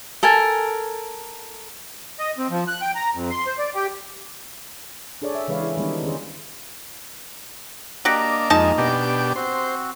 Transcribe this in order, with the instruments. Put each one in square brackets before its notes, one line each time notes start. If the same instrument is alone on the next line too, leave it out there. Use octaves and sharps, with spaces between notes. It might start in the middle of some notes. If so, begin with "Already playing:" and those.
[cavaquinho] A4 A#4 G#5
[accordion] D#5
C4
F3
F#6
G5
A#5
F2
C6
C5
D5
G4
[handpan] D4 G#4 A4 C#5 D5
E5
C#3 E3 G#3 B4 C#5 F5
E4 G#4
D#3 G3 G#3 B3 D4 D#4
D#3 C#4 G#4 C5
[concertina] A#3 D#5 A#5 [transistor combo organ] D4 [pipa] F#4 G4
[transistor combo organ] F2 G#3 [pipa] D#4 A5
[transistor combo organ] B2 D4 G4
[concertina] G5
[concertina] C4 F#4 [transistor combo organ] C5